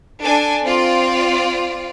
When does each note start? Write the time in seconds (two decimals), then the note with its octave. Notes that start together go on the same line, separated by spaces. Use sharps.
0.22 D4 A4 G#5
0.64 C4 F4 D5